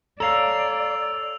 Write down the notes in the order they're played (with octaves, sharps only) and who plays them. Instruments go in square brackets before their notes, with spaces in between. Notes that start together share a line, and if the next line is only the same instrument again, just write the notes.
[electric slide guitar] A4 C#5 F5 [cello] D5 [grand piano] A#5 [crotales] E6 F7